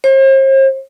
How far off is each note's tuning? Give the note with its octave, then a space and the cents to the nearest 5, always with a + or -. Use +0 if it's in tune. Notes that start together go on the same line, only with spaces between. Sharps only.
C5 +45